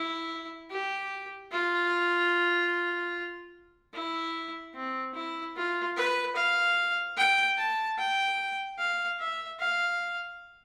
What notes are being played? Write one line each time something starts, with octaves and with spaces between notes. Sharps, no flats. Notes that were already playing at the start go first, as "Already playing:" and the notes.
Already playing: E4
G4
F4
E4
C4
E4
F4
B4
F5
G5
A5
G5
F5
E5
F5